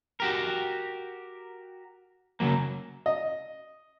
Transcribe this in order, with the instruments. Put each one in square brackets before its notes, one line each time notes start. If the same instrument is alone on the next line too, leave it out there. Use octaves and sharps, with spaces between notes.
[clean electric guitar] F#4 G4 A#4
C#3 F3 F#3 A#3
[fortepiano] D#5